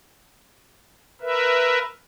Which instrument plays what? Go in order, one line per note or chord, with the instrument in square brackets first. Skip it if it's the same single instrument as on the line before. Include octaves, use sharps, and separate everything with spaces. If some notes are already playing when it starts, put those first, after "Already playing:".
[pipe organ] A#4 B4 E5